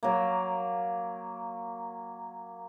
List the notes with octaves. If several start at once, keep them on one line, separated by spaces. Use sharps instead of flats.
F#3 A#3